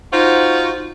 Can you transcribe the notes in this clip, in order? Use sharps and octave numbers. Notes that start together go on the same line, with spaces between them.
D#4 F4 F#4 C5